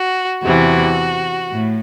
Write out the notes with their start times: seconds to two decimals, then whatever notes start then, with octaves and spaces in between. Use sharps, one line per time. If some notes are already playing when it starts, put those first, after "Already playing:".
Already playing: F#4
0.43 E2 C3 E3 F#4
1.52 A2